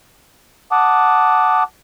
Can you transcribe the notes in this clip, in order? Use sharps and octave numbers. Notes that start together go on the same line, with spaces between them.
F#5 A5 D6 D#6